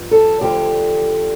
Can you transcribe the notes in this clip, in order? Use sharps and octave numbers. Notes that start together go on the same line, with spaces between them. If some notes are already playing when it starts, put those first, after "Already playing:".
Already playing: G2 F3
A4
D2 D3 F3 G4